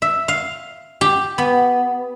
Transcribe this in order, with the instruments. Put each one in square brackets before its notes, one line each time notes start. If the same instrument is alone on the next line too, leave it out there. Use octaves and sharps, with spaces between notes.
[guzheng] E5
F5
G4
B3